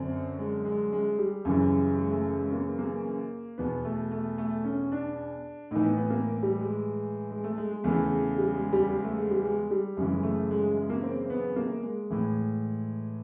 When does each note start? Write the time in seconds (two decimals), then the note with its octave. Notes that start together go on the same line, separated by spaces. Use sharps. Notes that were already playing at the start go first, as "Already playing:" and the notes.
Already playing: F#2 D3 C4
0.39 G#3
0.65 G#3
0.92 G#3
1.19 G3
1.45 F#2 C#3 E3
1.98 G#3
2.11 A3
2.39 G#3
2.52 A#3
2.79 A#3
3.58 E2 B2 B3
3.85 A3
4.11 A3
4.38 A3
4.64 C#4
4.92 D4
5.71 A2 E3 D#4
5.84 B3
5.97 B3
6.10 A#3
6.43 G3
6.60 G#3
7.30 G#3
7.44 A3
7.57 G#3
7.71 G#3
7.84 E2 C#3 E3 A3
8.38 G3
8.54 G#3
8.73 G3
8.90 G#3
9.04 A3
9.17 G#3
9.31 G3
9.44 G#3
9.71 G3
9.97 F#2 C#3 E3 G#3
10.23 A3
10.51 G#3
10.64 G#3
10.77 G#3
10.90 A#3
11.03 C4
11.30 B3
11.56 A#3
11.83 G#3
12.10 A2 E3